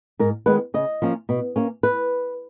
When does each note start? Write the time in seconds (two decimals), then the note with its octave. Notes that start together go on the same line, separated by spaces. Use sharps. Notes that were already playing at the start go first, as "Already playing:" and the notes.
0.19 G#2 A#4
0.46 D#3 G#3 B3 B4
0.74 C#3 D#5
1.02 F3 A#3 C#4
1.29 B2
1.56 A#3 C#4
1.83 B4